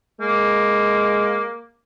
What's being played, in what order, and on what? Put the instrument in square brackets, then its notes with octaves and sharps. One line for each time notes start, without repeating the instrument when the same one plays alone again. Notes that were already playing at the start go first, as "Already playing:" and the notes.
[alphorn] G#3 [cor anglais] A#3